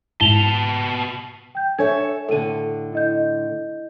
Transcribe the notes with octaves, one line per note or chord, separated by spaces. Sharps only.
G#2 B2 E4 A5 F7 G7
G5 G6
D4 A4 C#5 E5 G#5 G#6
A2 D3 A4 D#7
E4 D#5 G6